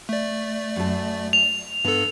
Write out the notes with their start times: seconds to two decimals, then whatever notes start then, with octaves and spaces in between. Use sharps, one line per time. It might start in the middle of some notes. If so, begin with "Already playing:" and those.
0.09 A3 D5
0.76 F#2 A4
1.33 F7
1.84 G2 B3 A4